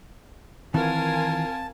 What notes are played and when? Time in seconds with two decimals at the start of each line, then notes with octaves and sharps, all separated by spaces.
0.74 D#3 E3 C4 F4 A#4 F5 G#5 A5